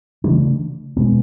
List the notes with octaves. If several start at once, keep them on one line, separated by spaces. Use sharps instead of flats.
C#3 E3 A3 D4
B2 G#3 B3